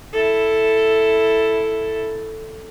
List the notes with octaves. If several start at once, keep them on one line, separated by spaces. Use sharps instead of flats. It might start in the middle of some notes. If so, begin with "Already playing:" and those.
E4 A4